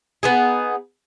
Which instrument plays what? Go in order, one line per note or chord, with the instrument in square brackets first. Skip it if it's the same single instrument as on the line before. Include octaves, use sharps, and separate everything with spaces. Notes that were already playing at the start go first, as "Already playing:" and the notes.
[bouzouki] B3 D#4 G#4